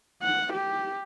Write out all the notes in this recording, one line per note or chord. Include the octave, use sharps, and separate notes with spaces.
F#5
G4